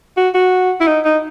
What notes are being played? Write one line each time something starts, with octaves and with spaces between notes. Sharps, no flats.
F#4
F#4
E4
D#4
D#4